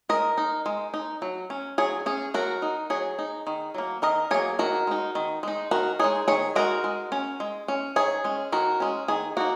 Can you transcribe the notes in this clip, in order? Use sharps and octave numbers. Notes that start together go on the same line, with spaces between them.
G#3 A#4 D#5
D#4
G#3
D#4
F#3
C#4
F#3 G#4 C#5
C#4 G#4
F#3 F#4 A#4
D#4
F#3 G#4 C#5
D#4
D#3
F#3 A#3
D#3 A#4 D#5
F#3 A#3 G#4 C#5
D#3 F#4 A#4
G#3 D#4
D#3
G#3 D#4
D#3 F#4 A#4
G#3 D#4 G#4 C#5
D#3 G#4 C#5
G#3 D#4 F#4 A#4
G#3
C#4
G#3
C#4
D#3 G#4 C#5
G#3 C#4
D#3 F#4 A#4
G#3 C#4
D#3 G#4
A#3 D#4 F#4